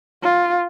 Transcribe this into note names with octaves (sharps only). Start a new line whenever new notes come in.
F4